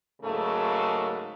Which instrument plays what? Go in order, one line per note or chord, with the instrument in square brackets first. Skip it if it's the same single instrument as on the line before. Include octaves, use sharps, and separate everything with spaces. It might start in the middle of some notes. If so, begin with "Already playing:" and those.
[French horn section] G#2 C#3 F#3 A3 A#3